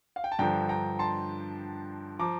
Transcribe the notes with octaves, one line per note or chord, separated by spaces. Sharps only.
F5
G5
A5
G2 D3 F3 G5 A#5
G5 A#5
A5 C6
F3 A#5 D6